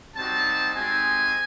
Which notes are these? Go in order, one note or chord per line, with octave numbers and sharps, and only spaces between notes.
G3 C4 D#4 F#4 A5
G#3 C4 D#4 G4 G#5